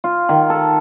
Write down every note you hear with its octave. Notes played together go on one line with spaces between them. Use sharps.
F4
D#3
A4